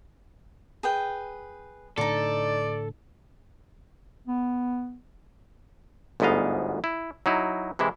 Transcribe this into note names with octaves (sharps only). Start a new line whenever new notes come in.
G#4 B4 G5
A2 D3 D#4 F4 A4 D5
B3
G1 D2 G#2 B3 D#5 F5
E4
F#3 D#4 E4
C3 E3 G#3 E4